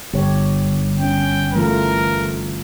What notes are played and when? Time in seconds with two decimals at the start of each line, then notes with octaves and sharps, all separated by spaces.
0.14 G1 G4 C#5
1.00 C#4 G5
1.54 E3 A3 F4 A#4